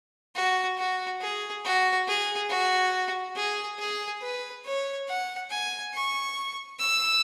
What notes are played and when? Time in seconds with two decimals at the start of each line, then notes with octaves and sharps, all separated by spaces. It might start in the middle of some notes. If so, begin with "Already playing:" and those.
0.35 F#4
0.78 F#4
1.21 G#4
1.65 F#4
2.07 G#4
2.49 F#4
3.36 G#4
3.79 G#4
4.22 B4
4.65 C#5
5.08 F#5
5.51 G#5
5.94 C#6
6.79 E6